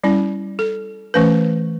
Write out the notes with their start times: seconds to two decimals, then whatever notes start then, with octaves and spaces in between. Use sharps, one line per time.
0.04 G3 C#4 E4
0.59 A4
1.14 E3 A3 C#4 B4